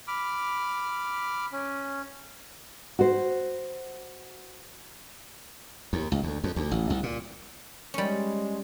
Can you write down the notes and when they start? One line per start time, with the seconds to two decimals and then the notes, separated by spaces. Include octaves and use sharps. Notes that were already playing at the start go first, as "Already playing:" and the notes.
0.07 B5 D6 F6
1.52 C#4
2.99 F#4 C5
5.93 D#2
6.12 C#2
6.23 D2
6.44 F2
6.56 D2
6.71 A1
6.90 C2
7.03 A#2
7.94 G3 G#3 C#4